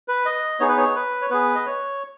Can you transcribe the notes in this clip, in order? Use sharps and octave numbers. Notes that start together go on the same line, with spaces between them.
B4
D#5
B3 D#4 G#4 C#5
B4
C#5
B4
C#5
B3 G#4 B4
D#5
C#5